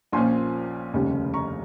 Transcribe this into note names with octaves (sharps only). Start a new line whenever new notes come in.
A#1 A#2 F3 A#3 C#4 G#5 C6
F1 D#2 C#3 G3 C#4
A#5 C#6